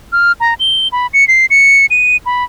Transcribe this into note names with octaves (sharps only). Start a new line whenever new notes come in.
F6
A#5
G7
B5
C#7
C7
C#7
D#7
B5